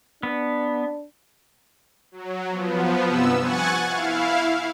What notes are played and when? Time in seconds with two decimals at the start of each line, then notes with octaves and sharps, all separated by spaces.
0.23 B3 D4
2.12 F#3
2.50 F3 B3
3.07 G2 C3 B3 E6
3.40 F#5 G#5 C#6 F#6 G#6 A6
3.86 E4 F5